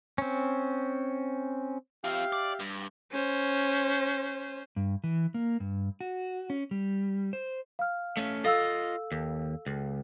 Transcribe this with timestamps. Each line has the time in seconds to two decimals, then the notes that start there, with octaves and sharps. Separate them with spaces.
0.18 C4 C#4
2.04 C4 F4 G4 E5 F5
2.32 D5
2.60 G2
3.11 C#4 C5
4.76 G2
5.04 E3
5.34 A#3
5.60 G2
6.01 F#4
6.50 C#4
6.71 G3
7.33 C5
7.79 F5 F6
8.17 A3 C#4
8.44 F4 A4 D#5 F5 E6
9.12 D#2
9.66 C#2